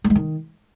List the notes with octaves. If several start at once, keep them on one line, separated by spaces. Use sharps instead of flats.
G3
G#3
D#3